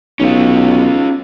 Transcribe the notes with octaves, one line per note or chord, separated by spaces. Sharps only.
B1 C#4 F4